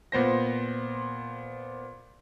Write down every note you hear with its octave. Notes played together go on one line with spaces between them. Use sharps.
A#2 B3 C5 A#6